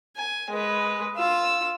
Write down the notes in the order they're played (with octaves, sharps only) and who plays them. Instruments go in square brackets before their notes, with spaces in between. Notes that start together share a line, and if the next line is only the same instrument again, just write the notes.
[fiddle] G#5
G#3 B4
F4 E6